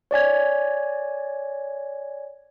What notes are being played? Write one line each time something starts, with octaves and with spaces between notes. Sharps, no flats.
C#5 D5 G#5 G#6